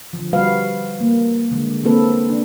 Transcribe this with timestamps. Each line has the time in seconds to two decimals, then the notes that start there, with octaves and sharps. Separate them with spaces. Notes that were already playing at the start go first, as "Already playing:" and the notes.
0.13 D3 F3
0.33 G3 F#4 B4 F5
1.00 A#3
1.51 D3 G#3
1.84 A#3 C4 D4 A4 B4
2.30 D4